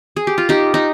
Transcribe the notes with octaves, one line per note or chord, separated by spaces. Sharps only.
G#4
G4
F4
D#4 G4
D#4